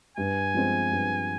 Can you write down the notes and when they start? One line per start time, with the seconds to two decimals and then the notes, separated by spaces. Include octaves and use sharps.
0.17 G2 G#5
0.54 F3 G#3 C4
0.91 G2